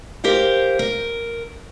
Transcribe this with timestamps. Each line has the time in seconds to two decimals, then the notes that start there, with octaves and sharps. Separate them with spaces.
0.24 G4 A#4 C5 F5
0.79 A#4